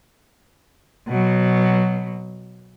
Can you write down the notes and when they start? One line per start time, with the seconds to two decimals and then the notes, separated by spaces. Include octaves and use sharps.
1.08 B2 F#3